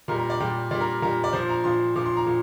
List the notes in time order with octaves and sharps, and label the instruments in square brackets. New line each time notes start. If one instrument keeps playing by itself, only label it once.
[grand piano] A#2 G3 A#4
A#4
D5
A#2 G3 G5
A#2 D5
G3
A#4
A#2 G3 A#4
D5
A#2 F3 C5
A#5
A#2 F3 C6
A#2 F3 D6
C6
A#5
A#2